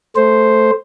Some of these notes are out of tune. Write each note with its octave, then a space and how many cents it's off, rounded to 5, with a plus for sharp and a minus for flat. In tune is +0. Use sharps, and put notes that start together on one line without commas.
A3 +0 C5 +0